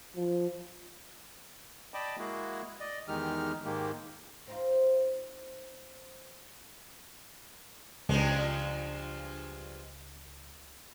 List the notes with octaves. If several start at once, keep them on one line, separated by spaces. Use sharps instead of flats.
F3
D5 D#5 G5 A5 B5 D6
G#3 A#3 E4 F#4 G#4
D5 D#5
E2 D#3 G#3 D#4 G4 F6
G#2 D#3 G#3 A#3 G4
C4 D#4 F4
C#2 G2 F3 G#3